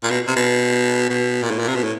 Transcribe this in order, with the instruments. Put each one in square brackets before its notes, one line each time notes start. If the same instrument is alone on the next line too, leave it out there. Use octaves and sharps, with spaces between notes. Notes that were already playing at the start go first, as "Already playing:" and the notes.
[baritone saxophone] A#2
B2
C3
B2
B2
A#2
A2
A#2
C3
B2
A2